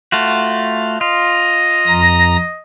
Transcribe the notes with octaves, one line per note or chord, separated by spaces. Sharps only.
A3 F4 F#4
F4 D#5
F2 A#5 A#6